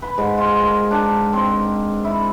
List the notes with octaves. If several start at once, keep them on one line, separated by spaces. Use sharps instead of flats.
B4
G#2
F4
A#4
D4
C4
E4